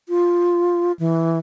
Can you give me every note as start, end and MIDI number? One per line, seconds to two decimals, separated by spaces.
0.09 0.92 65
0.99 1.39 52